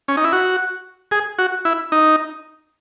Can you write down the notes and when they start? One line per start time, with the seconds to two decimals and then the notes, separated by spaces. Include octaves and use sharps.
0.08 C#4
0.17 D#4
0.24 E4
0.32 F#4
1.11 G#4
1.39 F#4
1.65 E4
1.92 D#4